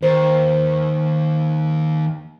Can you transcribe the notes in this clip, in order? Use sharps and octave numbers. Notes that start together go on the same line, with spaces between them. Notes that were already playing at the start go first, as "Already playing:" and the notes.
D#2 C5